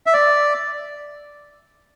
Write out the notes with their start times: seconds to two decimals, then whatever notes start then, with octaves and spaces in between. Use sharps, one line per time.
0.06 E5
0.13 D5